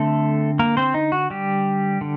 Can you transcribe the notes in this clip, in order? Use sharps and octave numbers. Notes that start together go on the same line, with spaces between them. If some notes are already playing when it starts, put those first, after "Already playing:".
Already playing: D3 A3 C4 A4
A#3 A#4
C4 C5
D#4
F#4
G3 G4
D3